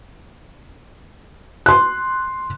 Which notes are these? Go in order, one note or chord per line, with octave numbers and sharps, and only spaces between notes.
C6 F#6